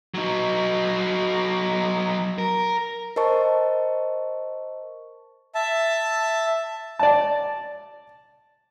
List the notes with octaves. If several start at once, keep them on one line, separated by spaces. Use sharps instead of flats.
F#3 D#4
A#4
A#4 C5 D#5 A5 C#6
E5 A5
D5 A5